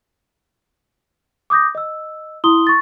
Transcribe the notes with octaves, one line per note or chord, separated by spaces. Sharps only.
D6 D#6 G6 A#6
D#5 E6
E4 C6 D#6 G7
C#6 A6